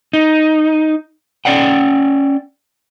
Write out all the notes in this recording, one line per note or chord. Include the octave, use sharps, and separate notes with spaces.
D#4
C#4 D5 F#5 G5